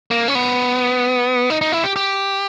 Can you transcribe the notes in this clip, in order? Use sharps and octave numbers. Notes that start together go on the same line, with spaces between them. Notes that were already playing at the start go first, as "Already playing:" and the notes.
A#3
C#4
B3
D#4
D#4
E4
G4
G4